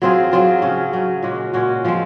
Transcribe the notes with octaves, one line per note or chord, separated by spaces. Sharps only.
F#3 C4 F4 G#4
F#3 C4 F4 G#4
C#3 F#3 C#4
C#3 F#3 C#4
A#2 G#3 C#4 F#4
A#2 G#3 C#4 F#4
F3 G#3 C4